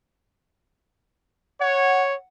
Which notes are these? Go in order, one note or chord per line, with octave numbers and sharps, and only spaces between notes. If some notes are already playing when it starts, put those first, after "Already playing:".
C#5 F#5